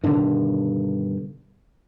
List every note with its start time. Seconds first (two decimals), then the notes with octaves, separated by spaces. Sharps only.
0.04 G2 B2 D3 D#3